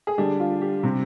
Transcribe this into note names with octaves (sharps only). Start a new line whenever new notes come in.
G#4
D3 G3 D4 G4
F4
G4
C3 G3 C4